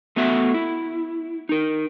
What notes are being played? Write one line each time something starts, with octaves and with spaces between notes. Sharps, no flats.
A3 B3 F#4 E5 F#5
E4
D#4 A#4